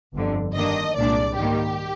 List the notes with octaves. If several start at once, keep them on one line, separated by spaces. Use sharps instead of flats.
G1 F2 D3
G2 D#3 A#3 D4 D#5
C2 A#2 G#3 D4 D5
G#2 D#3 G3 A#3 G4